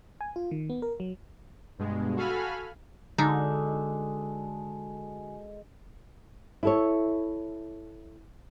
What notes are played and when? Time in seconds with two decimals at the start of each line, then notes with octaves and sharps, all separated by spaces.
0.21 G#5
0.36 F4
0.51 D#3
0.70 B3
0.82 A#4
1.00 F#3
1.79 G2 B2 G#3
2.16 F#4 A4 F5 G#5 B5 F6
3.18 D3 G#3 D#4 F#4 A4 D5 G#5
6.63 E4 A4 C#5